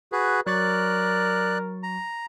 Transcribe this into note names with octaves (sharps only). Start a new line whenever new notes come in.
F#4 G#4 B4
F#3 A#4 D5 C#6 F#6 A6
A#5